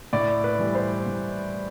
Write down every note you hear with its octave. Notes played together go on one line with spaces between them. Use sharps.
A2 D5
B4
E3 G3
C5
A2